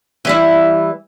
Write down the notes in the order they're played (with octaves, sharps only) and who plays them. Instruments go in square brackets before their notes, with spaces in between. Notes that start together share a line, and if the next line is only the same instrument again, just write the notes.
[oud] E3 G3 E4